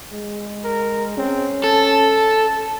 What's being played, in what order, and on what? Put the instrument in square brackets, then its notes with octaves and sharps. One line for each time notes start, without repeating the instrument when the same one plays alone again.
[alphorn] G#3
[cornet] A#4
[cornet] C4 [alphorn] C#4
[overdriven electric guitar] A4 [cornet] A5